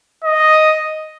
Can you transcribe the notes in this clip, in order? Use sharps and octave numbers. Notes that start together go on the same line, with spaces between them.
D#5